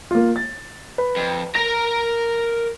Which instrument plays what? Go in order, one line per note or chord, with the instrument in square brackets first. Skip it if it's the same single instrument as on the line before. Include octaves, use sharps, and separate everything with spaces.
[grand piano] A#3 F4
A6
B4
[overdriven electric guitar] F2
[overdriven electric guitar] A#4 A#5 [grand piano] A#6